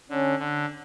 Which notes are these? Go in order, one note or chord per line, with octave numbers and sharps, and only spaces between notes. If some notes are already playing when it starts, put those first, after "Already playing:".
D3 C#4
D3